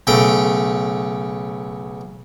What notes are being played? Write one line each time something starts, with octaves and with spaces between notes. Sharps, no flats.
B1 C#3 A3 G5